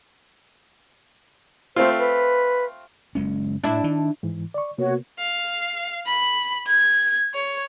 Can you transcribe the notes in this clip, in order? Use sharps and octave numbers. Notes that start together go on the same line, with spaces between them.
A3 C4 F4 C5
B4
F#1 G#3 C#4
A2 D4 E4
D#3
G#2 E3
D5 C#6
C3 A#3 B3 F#4 C#5
F5
B5
G#6
C#5